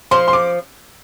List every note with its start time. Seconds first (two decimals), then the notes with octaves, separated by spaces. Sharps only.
0.11 F3 C6
0.28 C6
0.33 D6